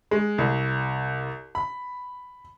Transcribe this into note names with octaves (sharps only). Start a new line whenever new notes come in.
G#3
C2
B5